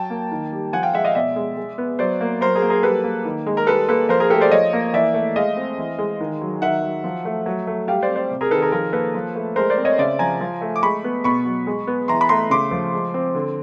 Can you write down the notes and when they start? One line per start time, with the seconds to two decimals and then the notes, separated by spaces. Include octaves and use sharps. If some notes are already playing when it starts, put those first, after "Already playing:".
Already playing: F#3 G5 A5
0.10 A#3
0.32 D#3
0.52 G3
0.73 F3 F#5 G#5
0.83 F5 G5
0.94 G#3 E5 F#5
1.05 D#5 F5
1.15 B2 D5 E5
1.36 G#3
1.57 G#3
1.78 B3
1.99 F#3 C5 D5
2.21 A#3
2.41 F#3 A#4 C5
2.55 G#4 A#4
2.62 A#3
2.70 G#4 A#4
2.83 G3 A4 B4
3.04 A#3
3.25 D#3
3.46 G#3
3.57 A#4
3.67 G3 A4 B4
3.89 A#3 A4 B4
4.09 F3 A#4 C5
4.20 G#4 A#4
4.30 A3 G4 A4
4.41 C5 D5
4.51 F3 C#5 D#5
4.73 A#3
4.93 E3 D5 E5
5.14 A3
5.36 G#3 D#5 F5
5.57 C4
5.78 E3
5.98 G#3
6.20 D#3
6.42 F#3
6.61 D#3 E5 F#5
6.82 F#3
7.04 F3
7.25 A3
7.46 F#3
7.67 A3
7.88 G3 F5 G5
8.02 C5 D5
8.09 C4
8.16 C5 D5
8.31 C3
8.41 G#4 A#4
8.51 D#3 A4 B4
8.61 G#4 A#4
8.72 F3 G#4 A#4
8.93 A#3 A4 B4
9.15 F3
9.36 A3
9.56 G#3 A#4 C5
9.70 C5 D5
9.78 C4
9.85 C#5 D#5
9.98 C#3 D5 E5
10.19 F3 G#5 A#5
10.41 F3
10.62 A3
10.76 D6
10.82 G#3 B5 C#6
11.04 B3
11.24 B2 B5 C#6
11.45 F#3
11.67 G#3
11.87 B3
12.08 E3 A#5 C6
12.21 B5
12.29 A3 A#5 C6
12.50 C#3 C6 D6
12.71 F3
12.93 G#3
13.14 C4
13.35 D3